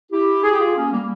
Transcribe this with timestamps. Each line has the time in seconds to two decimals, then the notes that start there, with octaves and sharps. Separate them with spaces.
0.12 E4 G4
0.43 G#4
0.51 G4
0.59 F4 G#4
0.76 A#3 C#4
0.91 G3 A#3